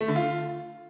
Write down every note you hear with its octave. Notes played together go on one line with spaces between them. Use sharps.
A3
D3
F4